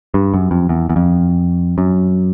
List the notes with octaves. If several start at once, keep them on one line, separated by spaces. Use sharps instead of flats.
G2
F#2
F2
E2
E2
F2
F#2